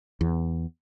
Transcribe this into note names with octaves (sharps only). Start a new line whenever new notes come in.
E2